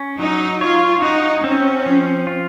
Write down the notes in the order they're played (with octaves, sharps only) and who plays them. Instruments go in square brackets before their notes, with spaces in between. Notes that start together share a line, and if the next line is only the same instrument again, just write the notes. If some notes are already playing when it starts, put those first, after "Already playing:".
Already playing: [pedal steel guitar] C#4
[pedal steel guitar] F#3 [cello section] D#4
[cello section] F4 [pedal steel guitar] C#5
[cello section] D#4 [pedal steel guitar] F#4
[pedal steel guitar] C4 [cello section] C#4
[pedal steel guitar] F3
F4